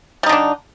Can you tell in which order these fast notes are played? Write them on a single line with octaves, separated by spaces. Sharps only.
G3 D#4 D3 D4